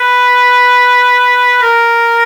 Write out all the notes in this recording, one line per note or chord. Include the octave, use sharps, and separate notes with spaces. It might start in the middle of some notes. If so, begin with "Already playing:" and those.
Already playing: B4
A#4